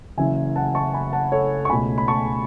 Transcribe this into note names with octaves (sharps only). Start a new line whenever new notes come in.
F#1 F#2 E3 E5 G#5
F#5 A5
A5 C#6
G#5 B5
F#5 A5
A4 C#5
C#6
C#2 B2 A3 G#5 B5
B5
A5 C#6